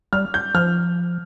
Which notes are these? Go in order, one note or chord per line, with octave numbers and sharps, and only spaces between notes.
G3 F6
G6
F3 F6